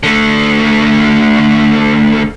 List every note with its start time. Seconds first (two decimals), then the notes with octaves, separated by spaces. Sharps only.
0.03 D3 A3